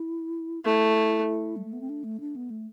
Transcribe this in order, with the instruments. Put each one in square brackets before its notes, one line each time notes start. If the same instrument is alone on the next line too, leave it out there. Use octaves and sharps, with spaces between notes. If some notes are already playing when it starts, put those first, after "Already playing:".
Already playing: [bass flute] E4
[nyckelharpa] A3 [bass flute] E4
[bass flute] G3
A3
B3
C4
D4
A3
D4
B3
A3